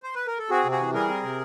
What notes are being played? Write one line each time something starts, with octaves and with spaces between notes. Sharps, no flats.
C5
B4
A#4
A4
C4 F#4 G#4
C3
F#4 G#4
E3
G3 G#4 A#4
C4
C3